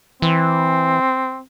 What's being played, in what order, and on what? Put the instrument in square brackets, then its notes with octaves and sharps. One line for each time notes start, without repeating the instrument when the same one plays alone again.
[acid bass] E3 [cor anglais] C4